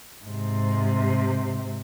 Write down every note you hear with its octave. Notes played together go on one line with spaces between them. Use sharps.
G#2 C3